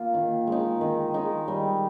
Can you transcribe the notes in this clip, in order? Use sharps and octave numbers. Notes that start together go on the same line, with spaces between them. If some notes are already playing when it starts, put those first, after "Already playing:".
Already playing: A#3 F4
D#3
G#3 D#4
D#3
G#3 D#4
G3